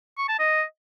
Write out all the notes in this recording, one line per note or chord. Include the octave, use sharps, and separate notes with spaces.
C#6
A5
D#5